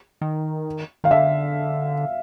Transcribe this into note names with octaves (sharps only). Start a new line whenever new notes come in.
D#3
D#3 F5
D3 E5